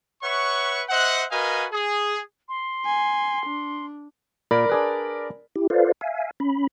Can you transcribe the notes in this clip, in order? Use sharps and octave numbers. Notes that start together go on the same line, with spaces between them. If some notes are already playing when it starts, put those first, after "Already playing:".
B4 C#5 E5 F#5 C#6
C5 D#5 E5 F#5
F#4 A#4 B4 D#5 F5 G#5
G#4
C6
G#5
D4
A#2 A#4 D5 B5
D4 G#4 B4
E4 G4
F4 A4 B4 C5 D5 F5
E5 F5 G#5
C#4 B5